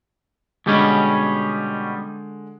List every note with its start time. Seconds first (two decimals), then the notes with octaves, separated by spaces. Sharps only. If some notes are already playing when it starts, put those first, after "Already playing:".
0.66 B2 D3 G3 G#3 C#4